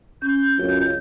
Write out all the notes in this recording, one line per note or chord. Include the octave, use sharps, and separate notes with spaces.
C#4 G6
C#2 F#2